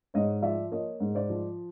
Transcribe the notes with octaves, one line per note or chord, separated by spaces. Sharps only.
G#2 C#5 D#5
F3 D5 E5
A#3 C#5 D#5
G#2
C5 D5
F3